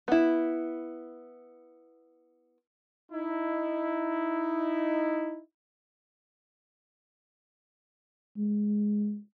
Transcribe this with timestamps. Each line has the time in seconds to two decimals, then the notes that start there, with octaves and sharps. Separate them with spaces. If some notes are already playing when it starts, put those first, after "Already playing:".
0.08 B3 E4
3.12 D#4 E4
8.37 G#3